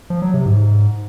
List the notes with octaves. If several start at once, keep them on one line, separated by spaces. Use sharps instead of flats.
F3
F#3
C3
G#2